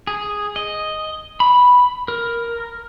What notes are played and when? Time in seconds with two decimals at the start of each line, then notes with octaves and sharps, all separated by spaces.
0.07 G#4
0.56 D#5
1.40 B5
2.08 A#4